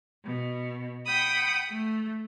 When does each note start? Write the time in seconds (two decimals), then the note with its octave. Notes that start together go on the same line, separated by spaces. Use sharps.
0.25 B2
1.05 F#5 G5 B5 D#6
1.69 A3